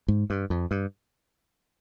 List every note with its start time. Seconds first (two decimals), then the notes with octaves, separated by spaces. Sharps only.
0.08 G#2
0.30 G2
0.50 F2
0.71 G2